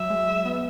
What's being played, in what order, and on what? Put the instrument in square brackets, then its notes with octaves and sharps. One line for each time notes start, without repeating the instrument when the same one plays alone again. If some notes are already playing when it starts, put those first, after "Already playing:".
Already playing: [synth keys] F#3 [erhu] E5
[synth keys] G#3
G#3
B3